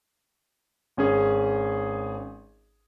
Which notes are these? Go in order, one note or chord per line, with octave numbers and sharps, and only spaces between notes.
G#1 C#4 G#4